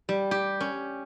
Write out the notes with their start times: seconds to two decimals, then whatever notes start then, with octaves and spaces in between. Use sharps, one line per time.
0.09 G3
0.31 G4
0.60 C#4